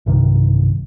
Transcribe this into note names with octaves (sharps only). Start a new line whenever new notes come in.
B1 G2 C3 D#3